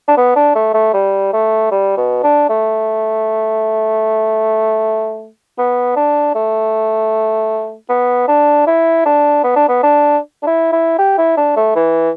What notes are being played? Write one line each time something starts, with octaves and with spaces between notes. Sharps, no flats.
D4
B3
D4
A3
A3
G3
A3
G3
B2
D4
A3
B3
D4
A3
B3
D4
E4
D4
B3
D4
B3
D4
D4
E4
E4
G4
E4
D4
A3
E3